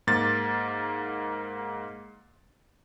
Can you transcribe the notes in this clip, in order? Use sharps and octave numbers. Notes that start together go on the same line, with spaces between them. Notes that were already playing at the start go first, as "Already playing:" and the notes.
G#2 A#3 A6